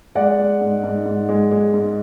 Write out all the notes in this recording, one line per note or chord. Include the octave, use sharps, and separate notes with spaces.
G#3 D5 F#5
G#3
G#2
G#2
G#2
G#3
G#3
G#2